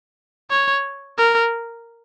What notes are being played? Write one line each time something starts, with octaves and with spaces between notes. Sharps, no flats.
C#5
A#4